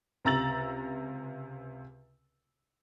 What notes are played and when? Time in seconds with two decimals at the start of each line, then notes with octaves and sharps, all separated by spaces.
0.25 C#2 C3 A#5 E6 A6 F#7